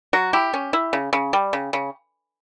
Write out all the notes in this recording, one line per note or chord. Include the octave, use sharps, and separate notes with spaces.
F#3 F#4
E4 G4
C#4
E4
C#3
C#3
G3
C#3
C#3